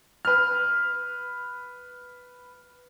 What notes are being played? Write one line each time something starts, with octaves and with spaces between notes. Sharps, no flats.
B4 F6